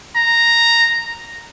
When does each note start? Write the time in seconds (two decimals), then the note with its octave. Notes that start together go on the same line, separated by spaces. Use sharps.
0.16 A#5